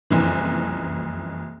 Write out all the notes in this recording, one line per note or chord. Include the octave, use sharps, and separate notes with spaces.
F#1 C2 F2 E3